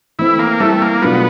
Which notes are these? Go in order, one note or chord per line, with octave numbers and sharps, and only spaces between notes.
E3 A3 C4 E4
A#3
G3 A3 C4 E4 G4 A#4
A#3
B2 F#3 A3 B3 D4 F4